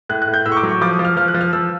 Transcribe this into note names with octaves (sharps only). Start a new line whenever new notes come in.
A2 F#6
F#6
A2
G6
A2 E6
C#6
D6
F#3
C#6
F3 D6
D#6
F3
F6
F3 F6
F#6
F3
F6
F3 E6